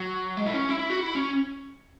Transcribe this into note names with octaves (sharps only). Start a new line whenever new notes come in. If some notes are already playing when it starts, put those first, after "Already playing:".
Already playing: F#3
G#3
E4
C#4
E4
E4
F#4
E4
C#4